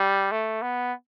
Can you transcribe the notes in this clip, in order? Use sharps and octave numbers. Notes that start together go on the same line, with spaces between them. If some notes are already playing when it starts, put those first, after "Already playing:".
Already playing: G3
A3
B3